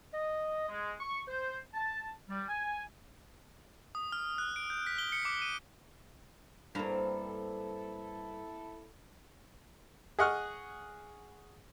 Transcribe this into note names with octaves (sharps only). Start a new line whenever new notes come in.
D#5
G#3
C#6
C5
A5
G3
G#5
D#6
F6
F#6
D7
G6
B6
G7
C#7
D6
D#7
G2 A#3 C4 E4 A4 A#5
G#4 D#5 F#5 C#6 F6